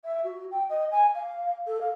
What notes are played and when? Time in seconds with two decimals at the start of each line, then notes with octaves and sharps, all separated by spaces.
0.04 E5
0.24 F#4
0.51 G5
0.69 D#5
0.91 G#5
1.14 F5
1.67 A4
1.81 F5